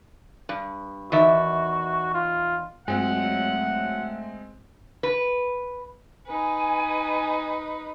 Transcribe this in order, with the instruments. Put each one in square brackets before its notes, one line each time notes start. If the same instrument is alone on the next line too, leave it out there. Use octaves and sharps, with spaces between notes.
[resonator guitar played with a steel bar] G2
[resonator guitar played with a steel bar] E2 D#3 E5 [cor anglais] F#4
[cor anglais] F4
[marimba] G2 [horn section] F#3 F#5 [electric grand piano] G#3 C4 [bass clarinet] A3
[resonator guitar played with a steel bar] B4
[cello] D#4 B4 [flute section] G#5